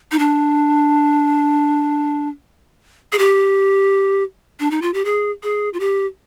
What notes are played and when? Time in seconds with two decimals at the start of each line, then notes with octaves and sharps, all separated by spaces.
0.11 D#4
0.19 D4
3.12 G#4
3.18 G4
4.60 D4
4.71 D#4
4.82 F4
4.94 G4
5.05 G#4
5.43 G#4
5.73 F4
5.80 G4